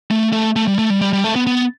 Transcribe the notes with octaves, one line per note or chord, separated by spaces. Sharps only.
A3
A3
A3
G3
A3
G3
G3
G3
A3
B3
B3